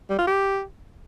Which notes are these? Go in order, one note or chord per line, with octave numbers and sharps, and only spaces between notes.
G3
F4
G4